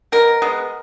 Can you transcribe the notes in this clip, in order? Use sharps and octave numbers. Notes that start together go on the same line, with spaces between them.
B2 A#4
G#3 B3